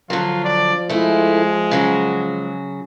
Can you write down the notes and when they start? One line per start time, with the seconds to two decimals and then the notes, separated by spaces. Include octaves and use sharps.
0.10 D3 F3 F#3 F4
0.45 D5
0.89 G#3 A3 E4
1.71 C#3 F#3 F#4